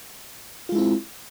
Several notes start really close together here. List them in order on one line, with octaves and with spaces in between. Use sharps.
F4 G#3 E4 C4